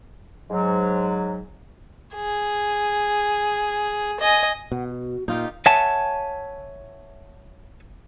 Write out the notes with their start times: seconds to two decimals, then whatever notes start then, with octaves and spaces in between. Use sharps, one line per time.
0.50 G#2 F#3
2.15 G#4
4.20 D#5 G#5
4.72 B2 F#5
4.89 F#4
5.28 A#2 D#4 F4 G4 F5
5.66 C#5 E5 F#5 G#5 A5